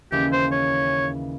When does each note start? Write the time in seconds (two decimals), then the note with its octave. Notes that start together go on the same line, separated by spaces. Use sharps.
0.12 D#2 C#3 E3 G4
0.32 C5
0.52 C#5